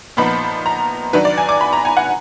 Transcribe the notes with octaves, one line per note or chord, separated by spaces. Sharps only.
A#2 F3 B3 D#4 B5
A#5
D#3 F#3 D4 B4
D5
G#5
D6
B5
A#5
G#5
F#5